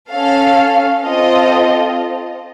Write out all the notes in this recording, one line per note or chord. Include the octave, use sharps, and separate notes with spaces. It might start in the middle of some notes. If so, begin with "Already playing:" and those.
C#4 A4 F5
C4 F4 A4 D#5